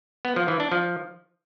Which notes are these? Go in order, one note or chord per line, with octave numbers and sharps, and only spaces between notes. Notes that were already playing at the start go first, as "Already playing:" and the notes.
B3
F3
E3
D4
F3